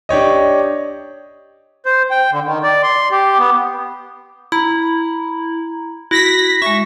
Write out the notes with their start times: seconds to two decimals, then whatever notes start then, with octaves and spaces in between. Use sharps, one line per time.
0.09 D4 G4 C#5 D#5
1.86 C5
2.11 G5
2.31 D3
2.45 D#3
2.63 D5
2.83 C6
3.11 G4
3.38 B3
4.52 E4 A#5
6.11 E4 F#4 A#6 B6
6.62 G#3 E5 C#6